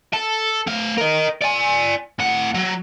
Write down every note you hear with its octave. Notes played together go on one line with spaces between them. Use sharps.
A4
A3 F5
A#4 D#5
D5 G#5
A2 F#5
F#3